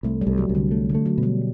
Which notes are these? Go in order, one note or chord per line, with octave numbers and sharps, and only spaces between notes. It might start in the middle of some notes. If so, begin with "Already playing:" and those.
C2 A3
G3
C2
F#3
C2
D3
A3
D3
A3
F#3
B2
G3